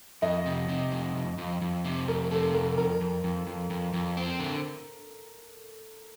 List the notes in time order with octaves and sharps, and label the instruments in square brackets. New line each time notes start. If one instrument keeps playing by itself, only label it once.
[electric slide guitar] F2 [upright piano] D#5
[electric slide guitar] C3
C3
F2
F2
F2
F2
C3
[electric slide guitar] F2 [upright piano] A#4
[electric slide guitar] C3 [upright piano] A4
[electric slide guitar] F2 [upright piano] A#4
[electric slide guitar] F2 [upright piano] A#4
[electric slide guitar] F2
F2
F2
F2
F2
C4
D3